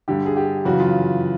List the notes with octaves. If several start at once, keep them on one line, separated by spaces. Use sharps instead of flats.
G2 D3 G4
G#4
G4
F#2 C#3 E3 F#4
F4